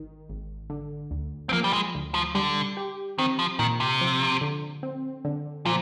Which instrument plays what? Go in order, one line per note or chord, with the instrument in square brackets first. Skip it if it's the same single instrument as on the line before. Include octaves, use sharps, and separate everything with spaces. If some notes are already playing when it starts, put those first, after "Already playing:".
Already playing: [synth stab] G#1 D#3
G#1
D3
D2
[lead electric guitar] C4
[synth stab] F3 [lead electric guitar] A#3
[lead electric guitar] G3
G#3
[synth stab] D2
[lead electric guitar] F3
[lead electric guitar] D3 [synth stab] G3
[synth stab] G4
[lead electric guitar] D#3 [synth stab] C4
[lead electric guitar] F3
[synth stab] A#2 [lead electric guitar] D#3
[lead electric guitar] C3
[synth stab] F3
D3
C4
D3
[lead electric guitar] A#2 [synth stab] F3